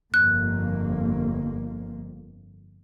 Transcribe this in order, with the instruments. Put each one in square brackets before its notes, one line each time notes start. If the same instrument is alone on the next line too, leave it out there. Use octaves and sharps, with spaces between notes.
[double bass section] G1 F2 A#3 [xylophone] F#6